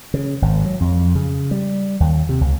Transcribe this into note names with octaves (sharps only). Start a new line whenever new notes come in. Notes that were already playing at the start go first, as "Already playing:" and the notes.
C#3
G#1
F#3
F2
C#3
G3
D#2
C3
C#2